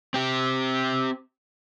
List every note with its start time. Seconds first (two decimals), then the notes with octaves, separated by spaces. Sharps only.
0.14 C4 G4